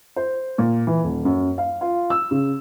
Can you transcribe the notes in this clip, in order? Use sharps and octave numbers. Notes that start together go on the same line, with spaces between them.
C5
A#2
E3
D#1
F#2
F5
F4
E6
C#3